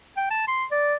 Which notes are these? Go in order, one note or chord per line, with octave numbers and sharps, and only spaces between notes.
G5
A5
C6
D5